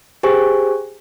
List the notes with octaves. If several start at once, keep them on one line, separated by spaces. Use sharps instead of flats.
G4 G#4 C5 G5 G#5 C#6